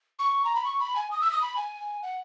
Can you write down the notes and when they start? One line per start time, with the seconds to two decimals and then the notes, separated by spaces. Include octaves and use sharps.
0.19 C#6
0.44 A#5
0.55 B5
0.64 C#6
0.80 B5
0.95 G#5
1.11 D#6
1.21 E6
1.31 D#6
1.41 B5
1.56 G#5
2.02 F#5